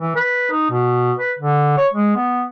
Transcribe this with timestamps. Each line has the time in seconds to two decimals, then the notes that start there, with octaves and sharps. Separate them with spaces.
0.01 E3
0.16 B4
0.51 D#4
0.71 B2
1.19 B4
1.39 D3
1.77 C#5
1.93 G#3
2.16 B3